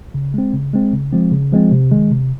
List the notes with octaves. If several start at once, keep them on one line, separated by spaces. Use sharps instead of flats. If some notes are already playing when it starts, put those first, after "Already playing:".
C#3
G#3 C4
C#3
G#3 C4
C#3
F3 G#3 C4
C#3
F3 G#3 C4
C3
D#3 G#3
C3